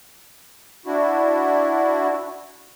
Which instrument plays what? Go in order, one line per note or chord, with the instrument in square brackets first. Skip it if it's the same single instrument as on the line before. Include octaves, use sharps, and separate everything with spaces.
[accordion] D4 E4 F#4